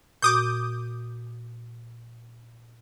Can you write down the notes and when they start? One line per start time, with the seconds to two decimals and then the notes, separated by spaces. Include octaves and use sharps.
0.22 A#2 F#4 D6 D#6 G6